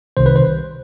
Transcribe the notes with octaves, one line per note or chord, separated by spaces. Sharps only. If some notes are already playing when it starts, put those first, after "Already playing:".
C2 C3 D#3 C5
B4
C5